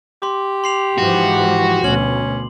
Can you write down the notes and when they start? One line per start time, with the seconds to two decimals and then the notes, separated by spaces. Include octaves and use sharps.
0.22 G4 C6 D6
0.64 C6 C7 F7
0.98 G#2 E3 F3 F#4
1.84 D2 B2 C#4 F#7